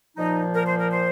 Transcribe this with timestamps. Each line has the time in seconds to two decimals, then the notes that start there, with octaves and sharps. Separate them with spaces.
0.16 A#2 F3 D#4
0.53 A#4
0.65 C5
0.78 A#4
0.90 C5